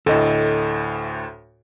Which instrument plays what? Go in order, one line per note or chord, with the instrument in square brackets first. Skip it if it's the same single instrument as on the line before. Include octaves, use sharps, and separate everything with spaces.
[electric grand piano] D2 A2 [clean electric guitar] A4 D#5